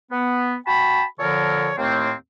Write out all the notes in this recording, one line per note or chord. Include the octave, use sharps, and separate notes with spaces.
B3
F#4 G5 A5 B5
A#2 D3 F3 A4 A#4 C#5
D#2 A2 A3 A#3 C4